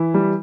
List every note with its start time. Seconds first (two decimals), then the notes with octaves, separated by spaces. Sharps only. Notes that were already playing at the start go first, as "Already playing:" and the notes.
Already playing: E3 E4
0.14 G3